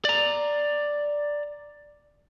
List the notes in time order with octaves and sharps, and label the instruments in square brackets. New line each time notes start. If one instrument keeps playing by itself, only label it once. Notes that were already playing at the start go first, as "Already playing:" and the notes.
[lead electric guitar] D5 A#5